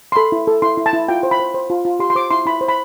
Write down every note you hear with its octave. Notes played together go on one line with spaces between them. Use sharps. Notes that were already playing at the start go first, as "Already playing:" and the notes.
C6
A4 B5
E4
A4
E4 C6
E4
A5
E4
F4 G5
C5
B5
C5
C5
F4
F4
G4 C6
C6
C5 D6
E4 C6
E4 B5
C5
B5